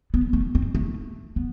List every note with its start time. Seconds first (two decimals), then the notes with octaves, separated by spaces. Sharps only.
0.14 B3
0.33 A3
0.55 C4
0.75 A3
1.36 B3